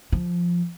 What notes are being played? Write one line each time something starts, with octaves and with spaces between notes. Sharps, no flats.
F3